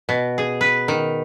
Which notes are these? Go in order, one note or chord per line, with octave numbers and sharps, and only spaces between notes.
B2
G#4
B4
D#3